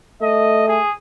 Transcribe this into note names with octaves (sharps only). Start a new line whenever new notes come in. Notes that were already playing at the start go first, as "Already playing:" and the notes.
A3 D#5
G#4